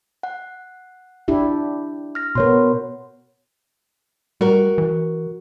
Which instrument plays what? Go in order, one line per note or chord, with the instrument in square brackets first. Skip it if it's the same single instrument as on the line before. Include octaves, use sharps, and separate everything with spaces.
[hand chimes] F#5
[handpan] D4 E4 G4
[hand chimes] F6 A#6
[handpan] B2 B3 [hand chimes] A#4 C#5 C6
[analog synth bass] G3 [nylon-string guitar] F#4 A#4
[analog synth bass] E3